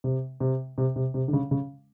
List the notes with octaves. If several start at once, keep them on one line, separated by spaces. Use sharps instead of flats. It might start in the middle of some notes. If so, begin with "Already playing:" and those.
C3
C3
C3
C3
C3
D3
C#3
C#3